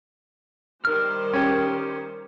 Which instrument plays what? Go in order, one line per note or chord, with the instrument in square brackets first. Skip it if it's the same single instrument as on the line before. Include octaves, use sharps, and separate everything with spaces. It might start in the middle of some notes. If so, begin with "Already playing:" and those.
[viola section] D#3 G3 C5 [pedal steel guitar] F6
[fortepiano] C#4 G4